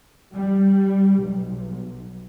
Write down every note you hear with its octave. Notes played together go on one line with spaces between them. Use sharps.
G3
B1